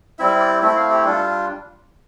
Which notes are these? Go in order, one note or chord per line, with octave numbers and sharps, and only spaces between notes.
G3 C4 E4 E5
D5
A3 C4 E4 E5
F5
G4
G3 D4 F4 A4